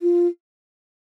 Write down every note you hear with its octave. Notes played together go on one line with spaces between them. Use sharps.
F4